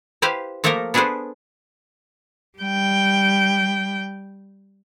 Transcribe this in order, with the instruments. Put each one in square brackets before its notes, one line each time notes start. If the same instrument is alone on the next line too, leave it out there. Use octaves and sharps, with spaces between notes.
[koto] E4 G4 B4 C5 F5
F3 A3 A#3 A4 A#4 A#5
B3 D4 G#4 A4 B4 C5
[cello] G3 G5